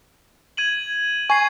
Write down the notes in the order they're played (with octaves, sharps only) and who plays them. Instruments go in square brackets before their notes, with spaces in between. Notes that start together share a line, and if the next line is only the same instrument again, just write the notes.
[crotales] G#6 D#7 F#7
[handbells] G#5 [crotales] C#6 G#6 C7